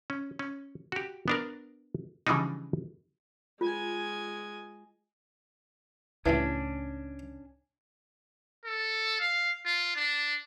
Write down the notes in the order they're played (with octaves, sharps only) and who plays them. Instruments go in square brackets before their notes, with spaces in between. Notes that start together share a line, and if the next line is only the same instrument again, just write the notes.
[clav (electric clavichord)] C#4
C#4
F#4 G4
B3 D4 A#4
C#3 E3 F3 G3 D4 D#4
[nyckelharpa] G#3 G#5 [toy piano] F4
[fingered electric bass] C#2 A2 [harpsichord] E3 F3 G3 [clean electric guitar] C#4 D4
[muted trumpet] A4
F5
F4
D4